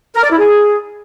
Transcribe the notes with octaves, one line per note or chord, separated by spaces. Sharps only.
A#4
D5
E4
G#4